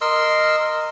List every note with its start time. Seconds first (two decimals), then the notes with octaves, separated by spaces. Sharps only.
0.01 A#4 D#5 C6 E6